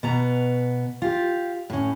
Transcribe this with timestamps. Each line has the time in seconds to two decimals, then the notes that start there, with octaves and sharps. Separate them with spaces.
0.03 B2 B3 A#5
1.02 F4 G4
1.70 A2 C#4